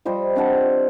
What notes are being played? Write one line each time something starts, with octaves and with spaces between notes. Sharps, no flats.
F3 G3 C5 D#5
C4 D4 F#5 A5